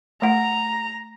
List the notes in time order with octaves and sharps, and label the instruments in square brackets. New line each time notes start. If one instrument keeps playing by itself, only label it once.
[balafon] A3 F#5 [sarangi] A#5